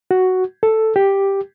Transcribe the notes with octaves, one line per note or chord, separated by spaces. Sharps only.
F#4
A4
G4